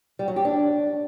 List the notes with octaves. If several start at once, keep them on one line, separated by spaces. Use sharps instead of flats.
G3
F#3
G4
D4